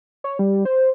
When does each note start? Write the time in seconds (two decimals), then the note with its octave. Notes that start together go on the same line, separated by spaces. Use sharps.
0.24 C#5
0.39 G3
0.65 C5